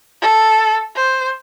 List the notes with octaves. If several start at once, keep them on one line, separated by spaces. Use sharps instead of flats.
A4
C5